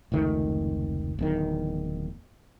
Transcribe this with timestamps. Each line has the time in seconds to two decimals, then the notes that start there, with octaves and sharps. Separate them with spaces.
0.12 F1 C#2 D#3 A3
1.19 D1 E2 D#3